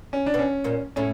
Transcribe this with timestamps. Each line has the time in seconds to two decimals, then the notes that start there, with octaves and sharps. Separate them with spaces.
0.13 C#4
0.26 D4
0.34 B2 B3
0.39 C#4
0.64 A#2 A#3
0.96 A2 A3 C#4